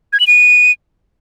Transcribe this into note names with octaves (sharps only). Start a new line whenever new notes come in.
G#6
F#7
D#7